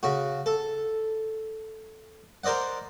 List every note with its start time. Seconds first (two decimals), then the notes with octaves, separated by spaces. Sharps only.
0.03 C#3 F#4
0.46 A4
2.44 A#4 C5 D5 D#5 F#5